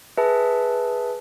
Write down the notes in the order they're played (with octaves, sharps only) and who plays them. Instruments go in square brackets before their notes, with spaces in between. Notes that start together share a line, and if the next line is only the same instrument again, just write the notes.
[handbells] G#4 B4 E5 A5